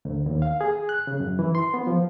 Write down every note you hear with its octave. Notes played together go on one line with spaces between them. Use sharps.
D2
D#2
F5
G#4
F#6
C#3
F#2
E3
C6
B3
F3